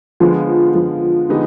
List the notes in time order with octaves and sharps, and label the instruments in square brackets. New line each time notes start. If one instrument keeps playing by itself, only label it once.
[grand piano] D3 G#3 B3 [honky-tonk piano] F3
[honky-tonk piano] F3
[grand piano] D3 G#3 B3 D#4 G4